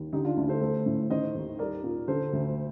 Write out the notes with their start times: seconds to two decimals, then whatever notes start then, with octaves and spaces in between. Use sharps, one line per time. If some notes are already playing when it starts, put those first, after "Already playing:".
Already playing: D#2
0.13 D3 D#4 G4
0.25 D4 F4
0.37 D2 D4
0.49 A4 C5
0.61 A3 A4 C5
0.86 A2
1.10 D#3 C5 D#5
1.35 D#2
1.59 G3 A#4 D5
1.84 A#2
2.08 D3 A4 C5
2.33 D2